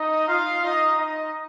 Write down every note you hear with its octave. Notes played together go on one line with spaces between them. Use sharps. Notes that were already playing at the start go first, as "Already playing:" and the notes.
Already playing: D#4 D#5
F4 F5
D#4 D#5
D#4 D#5